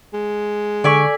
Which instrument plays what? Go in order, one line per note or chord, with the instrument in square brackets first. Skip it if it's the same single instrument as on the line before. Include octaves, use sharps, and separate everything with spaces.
[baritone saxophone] G#3
[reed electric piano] D3 C#6 [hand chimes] A4 E6 B6 [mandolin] D5 G#5